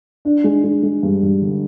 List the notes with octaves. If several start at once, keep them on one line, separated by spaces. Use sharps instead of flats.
D4
G#3
G#3
G#3
G2
G2
D3